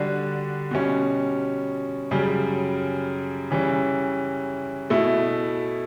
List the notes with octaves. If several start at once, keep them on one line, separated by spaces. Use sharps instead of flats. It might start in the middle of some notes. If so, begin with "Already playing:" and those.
Already playing: D3 G3 D4 F#4
B2 G3 C#4
F#2 C#3 G3
C#3 E3 G3 C#4
B2 A3 E4